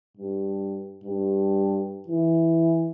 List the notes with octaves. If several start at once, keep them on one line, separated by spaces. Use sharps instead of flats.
G2
G2
E3